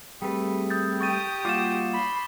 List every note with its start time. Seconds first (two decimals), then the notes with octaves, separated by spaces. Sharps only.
0.22 G3 A3 C4 G#4 B4
0.70 D#6 G6 A6
1.01 G4 C#6 D#6 A6 D#7
1.45 G3 A#3 F4 F#4 D6 A6 E7
1.93 B5 C6